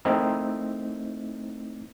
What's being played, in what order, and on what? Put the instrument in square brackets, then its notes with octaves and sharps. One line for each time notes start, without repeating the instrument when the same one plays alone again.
[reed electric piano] A3 A#3 C4 D#4 E4